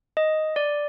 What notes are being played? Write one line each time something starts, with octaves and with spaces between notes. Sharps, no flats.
D#5
D5